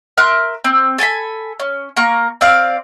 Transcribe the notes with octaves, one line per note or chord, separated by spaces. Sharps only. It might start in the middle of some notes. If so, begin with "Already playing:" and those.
A#4 E5 C6 F#6
C4
A4 G#5 A5 B5
C#4
A#3 A#5 C#6
C4 D5 F5